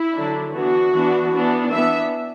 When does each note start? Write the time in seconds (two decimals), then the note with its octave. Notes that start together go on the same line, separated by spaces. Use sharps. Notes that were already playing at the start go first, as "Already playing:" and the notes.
Already playing: E4
0.14 D3 F#3 D4
0.53 E3 B3 D4 F#4
0.93 E3 B3 D4
1.32 E3 B3 D4
1.71 E3 B3 D4 E5